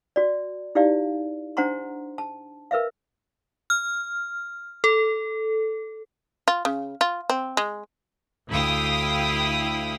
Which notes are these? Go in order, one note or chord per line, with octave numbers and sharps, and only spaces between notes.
F#4 D5
D#4 E4 G4 D5 F5
D4 C5 F#5 A#5 C6
A5
A#4 B4 E5 F5
F6
A4
F4
C#3
F4
C4
G#3
D2 E4 F5 G5 D#6